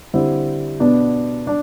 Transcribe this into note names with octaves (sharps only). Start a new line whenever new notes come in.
D3 G3 C4 E4
B2 B3 D4
D4